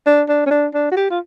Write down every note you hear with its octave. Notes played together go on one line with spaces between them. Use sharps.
D4
D4
C#4
D4
D4
F#4
G4
F4